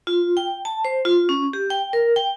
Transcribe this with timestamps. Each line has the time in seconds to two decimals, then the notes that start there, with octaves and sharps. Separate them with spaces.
0.07 F4
0.37 G5
0.65 A5
0.85 C5
1.05 F4
1.29 C#4
1.53 G4
1.70 G5
1.93 A#4
2.16 G5